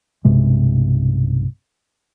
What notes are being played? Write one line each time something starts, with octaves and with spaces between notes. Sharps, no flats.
B1 G2 C3 G#3